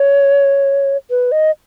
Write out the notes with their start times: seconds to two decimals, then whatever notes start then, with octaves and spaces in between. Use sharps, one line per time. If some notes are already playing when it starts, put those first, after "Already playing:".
Already playing: C#5
1.10 B4
1.32 D#5